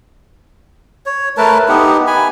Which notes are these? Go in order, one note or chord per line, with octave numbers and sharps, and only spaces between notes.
C#5
A3 A#4 B4 A5
B3 D#4 G4 F#5
G#5 B5